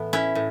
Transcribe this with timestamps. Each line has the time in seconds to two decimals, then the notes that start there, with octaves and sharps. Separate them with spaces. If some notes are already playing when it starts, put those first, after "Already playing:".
Already playing: A2 E3 A3 B3
0.13 C#4 E4
0.35 A2